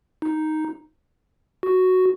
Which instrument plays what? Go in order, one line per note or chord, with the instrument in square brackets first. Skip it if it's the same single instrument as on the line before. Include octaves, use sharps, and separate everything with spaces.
[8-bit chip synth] D#4
F#4